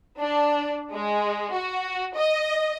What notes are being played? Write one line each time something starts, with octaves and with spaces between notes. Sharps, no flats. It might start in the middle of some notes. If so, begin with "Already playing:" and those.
D4
G#3
F#4
D#5